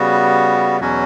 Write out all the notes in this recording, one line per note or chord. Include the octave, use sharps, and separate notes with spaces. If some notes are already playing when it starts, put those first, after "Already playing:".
Already playing: C#3 G3 B3 F#4
E2 B2 F#3 C#4 F#4